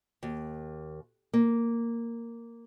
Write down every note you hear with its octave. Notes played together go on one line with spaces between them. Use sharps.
D#2
A#3